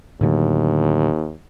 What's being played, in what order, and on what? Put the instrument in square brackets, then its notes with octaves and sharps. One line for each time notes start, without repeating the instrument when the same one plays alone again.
[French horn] D#2 [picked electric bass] A2 D3 F#3